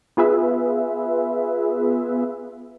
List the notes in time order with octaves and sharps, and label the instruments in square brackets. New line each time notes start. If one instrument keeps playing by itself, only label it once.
[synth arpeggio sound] B3 F4 G#4 B4 E5